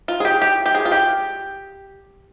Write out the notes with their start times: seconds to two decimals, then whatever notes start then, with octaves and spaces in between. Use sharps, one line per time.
0.08 F4
0.20 G#4
0.25 G4
0.42 G4
0.66 G4
0.75 G#4
0.85 F4
0.92 G4